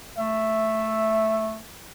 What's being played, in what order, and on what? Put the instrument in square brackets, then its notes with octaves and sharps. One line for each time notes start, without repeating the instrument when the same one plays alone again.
[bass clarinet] A3 [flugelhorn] E5